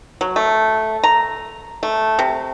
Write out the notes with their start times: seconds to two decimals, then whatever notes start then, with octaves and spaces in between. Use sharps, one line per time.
0.21 F#3
0.36 A3
1.04 A#5
1.83 A3
2.19 C3